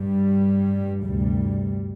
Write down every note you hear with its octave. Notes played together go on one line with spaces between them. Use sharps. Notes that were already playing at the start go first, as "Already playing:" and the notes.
Already playing: G2 G3
D2 G2 C3 G3